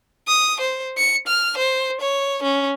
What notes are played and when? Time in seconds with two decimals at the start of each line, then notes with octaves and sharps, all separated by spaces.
0.28 D#6
0.60 C5
0.98 C#7
1.27 F6
1.57 C5
2.01 C#5
2.43 C#4